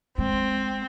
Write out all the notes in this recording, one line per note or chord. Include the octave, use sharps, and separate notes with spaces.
G#3 C4